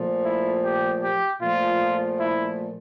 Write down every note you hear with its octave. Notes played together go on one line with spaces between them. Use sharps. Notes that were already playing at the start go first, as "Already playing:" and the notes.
Already playing: A#2 F3 A3
E4
G4
G4
A#2 F3 A3 F4
E4